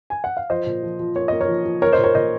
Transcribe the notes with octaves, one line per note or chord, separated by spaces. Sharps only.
G#5
F#5
F5
F3 C5 D#5
A#2
F3
F3
A#3 C#5
A#3 D#5
A#4 C#5
F3
F3
A#3 A#4 C#5
C5 D#5
A#2
A#4 C#5
A#2 C5 D#5